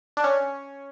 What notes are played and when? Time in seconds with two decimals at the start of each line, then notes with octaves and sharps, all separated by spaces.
0.17 D4
0.24 C#4